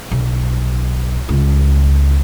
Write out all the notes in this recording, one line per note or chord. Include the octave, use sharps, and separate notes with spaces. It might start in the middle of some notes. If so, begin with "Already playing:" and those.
B1
C#2